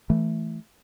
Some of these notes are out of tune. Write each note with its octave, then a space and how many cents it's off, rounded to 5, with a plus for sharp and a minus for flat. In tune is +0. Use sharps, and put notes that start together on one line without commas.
E3 +0 A3 -5